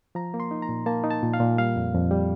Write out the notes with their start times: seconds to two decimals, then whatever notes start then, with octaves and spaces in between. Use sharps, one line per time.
0.15 F3 A#5
0.34 A#3
0.40 C6
0.51 D#4
0.62 A#5
0.69 A#2
0.86 A#3 A5
1.04 D#4
1.11 A5
1.23 A#2
1.34 F5
1.40 A#2
1.58 G3 F5
1.76 F2
1.94 F2
2.11 G3